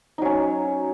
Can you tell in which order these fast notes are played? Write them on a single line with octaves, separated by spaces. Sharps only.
D#4 F#3 C#4